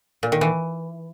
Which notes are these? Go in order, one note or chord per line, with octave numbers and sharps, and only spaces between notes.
A#2
D#3
E3